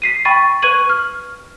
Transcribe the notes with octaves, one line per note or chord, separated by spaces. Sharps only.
B6 C7 D#7
G5 B5 C#6 A6 D#7
B4 C#6 G#6 D#7 F#7
F6